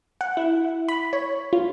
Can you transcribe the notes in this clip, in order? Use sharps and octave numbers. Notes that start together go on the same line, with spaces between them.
F#5
E4
B5
C#5
F4